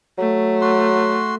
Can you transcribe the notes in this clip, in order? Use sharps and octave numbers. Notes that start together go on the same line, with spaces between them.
F#3 A3
F#4 C6